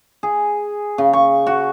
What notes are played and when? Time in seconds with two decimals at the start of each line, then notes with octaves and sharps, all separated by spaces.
0.23 G#4
0.98 C#3
1.13 C#6
1.47 F#4